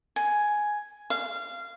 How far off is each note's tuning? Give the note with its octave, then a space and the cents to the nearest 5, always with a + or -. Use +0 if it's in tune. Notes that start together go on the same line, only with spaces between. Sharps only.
G#5 +5
F5 -20